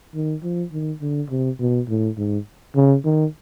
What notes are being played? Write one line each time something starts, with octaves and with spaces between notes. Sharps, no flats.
D#3
F3
D#3
D3
C3
B2
A2
G#2
C#3
D#3